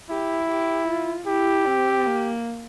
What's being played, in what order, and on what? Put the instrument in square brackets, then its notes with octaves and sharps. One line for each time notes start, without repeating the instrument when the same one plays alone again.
[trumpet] E4 [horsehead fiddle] G4
[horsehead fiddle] G4
F4
[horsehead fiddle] E4 [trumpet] G4
[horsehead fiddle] C4
A#3